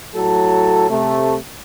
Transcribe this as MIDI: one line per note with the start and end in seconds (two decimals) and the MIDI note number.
0.14 0.87 45
0.14 0.87 54
0.14 0.87 69
0.89 1.35 48
0.89 1.35 57